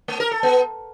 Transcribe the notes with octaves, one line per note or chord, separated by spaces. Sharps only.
A3
A#4
A4
B3